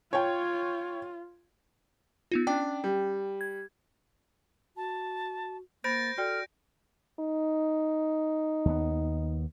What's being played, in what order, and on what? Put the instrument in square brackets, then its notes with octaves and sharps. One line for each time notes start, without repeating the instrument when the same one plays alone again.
[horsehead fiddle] F4 [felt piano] C#5 G5
[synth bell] B3 D#4 F4
[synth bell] C#4 G5 [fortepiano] D4
[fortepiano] G3
[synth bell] G#6
[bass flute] F#4 [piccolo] A5
[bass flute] A#3 [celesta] C5 B5 [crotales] G6 A#6 D7 [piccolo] A6
[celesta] F#4 D5 G5 [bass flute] A4 [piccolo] F6
[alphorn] D#4
[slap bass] D#2 B3